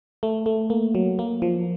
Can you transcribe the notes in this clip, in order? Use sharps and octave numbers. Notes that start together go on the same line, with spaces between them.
A3
A3
A#3
F#3
A#3
F3